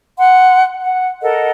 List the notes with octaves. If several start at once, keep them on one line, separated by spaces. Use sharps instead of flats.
F#5 C6
F#5
A4 A#4 D#5 F#5